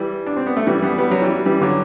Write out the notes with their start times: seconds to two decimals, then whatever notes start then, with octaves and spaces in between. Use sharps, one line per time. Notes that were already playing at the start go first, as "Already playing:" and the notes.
Already playing: E3 G3
0.26 D4
0.36 C4
0.47 B3
0.57 A3
0.67 E3 G3
0.82 G3 B3
0.98 G3 B3
1.11 F#3
1.22 E3 G3
1.46 E3 G3
1.61 D3 F#3